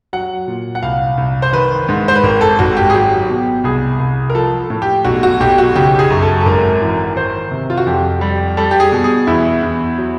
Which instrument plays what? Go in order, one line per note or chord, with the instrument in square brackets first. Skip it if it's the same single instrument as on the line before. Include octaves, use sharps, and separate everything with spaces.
[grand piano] F#3 F#5
A#2
F#5
C2 F5
C2
C5
D#3 B4
G#2
C5
B4
G#1 A#4
A4
G#1 F#4
G4
G#4
F#3 G4
B2
C2 G#4
C2
A#4
F3 A4
A2
G4
B1 F#4
F#4
B1 G4
F#4
C#3 G4
G4
G#4
F#2
A4
A4
G#1 A#4
E3
D#3 C5
C3
F4
F#4
F2 G4
G3
G3 A4
G4
G#4
B2
G#4
E2 E4
E2
F#3